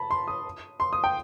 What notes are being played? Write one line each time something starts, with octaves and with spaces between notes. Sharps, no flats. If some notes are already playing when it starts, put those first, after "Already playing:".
Already playing: A5 B5
C6
D#6
C6
D#6
G5